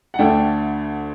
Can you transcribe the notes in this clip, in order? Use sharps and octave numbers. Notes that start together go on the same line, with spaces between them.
F#5
D2 D3 A3 D4 G5